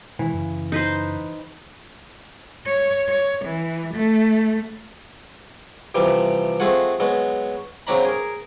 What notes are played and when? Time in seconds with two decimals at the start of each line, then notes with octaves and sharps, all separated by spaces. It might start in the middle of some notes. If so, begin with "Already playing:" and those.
0.19 B2 D#3 E3 G#3
0.33 F#2 C#3
0.72 D#4 B4 C5
2.66 C#5
3.09 C#5
3.45 E3
3.94 A3
5.95 C3 E3 F3 G3
6.60 A3 C4 F4 F#4 G#4 F#5
7.00 F#3 G#3 B3 F#4
7.87 C#3 F#3 C4 D4 A#5 B5
8.05 G#4 A#4